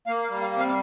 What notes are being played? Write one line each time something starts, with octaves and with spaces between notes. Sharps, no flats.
A#3 F5
F5
G3
F5
C3
F5